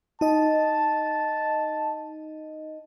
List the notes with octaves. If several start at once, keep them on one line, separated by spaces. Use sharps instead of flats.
D#4 D#5 A5